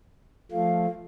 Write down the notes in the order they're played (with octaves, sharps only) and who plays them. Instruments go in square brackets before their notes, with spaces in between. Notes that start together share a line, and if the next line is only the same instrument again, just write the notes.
[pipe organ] F3 A3 [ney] F5